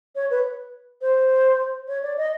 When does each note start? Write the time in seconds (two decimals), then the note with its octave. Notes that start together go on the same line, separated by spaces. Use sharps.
0.15 C#5
0.30 B4
1.01 C5
1.87 C#5
2.02 D5
2.17 D#5